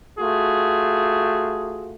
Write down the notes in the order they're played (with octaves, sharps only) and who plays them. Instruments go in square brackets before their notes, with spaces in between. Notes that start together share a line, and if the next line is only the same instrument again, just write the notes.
[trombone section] A3 F4 F#4 G#4